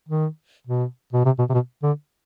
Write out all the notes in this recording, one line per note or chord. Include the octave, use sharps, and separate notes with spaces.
D#3
B2
B2
C3
B2
C3
B2
D3